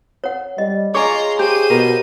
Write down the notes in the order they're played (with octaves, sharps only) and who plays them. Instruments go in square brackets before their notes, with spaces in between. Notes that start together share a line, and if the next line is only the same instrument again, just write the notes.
[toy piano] C#5 F#5
[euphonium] G3 [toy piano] D#5
[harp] F4 C#5 [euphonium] G#4 [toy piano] D#5 G#5 D6 [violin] A#5 C6
[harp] G4 [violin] C5 D#7
[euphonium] B2 [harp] A#4